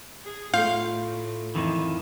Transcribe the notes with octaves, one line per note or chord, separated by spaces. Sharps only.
G#4
A2 A3 F4 F5 G6
F2 D#3 E3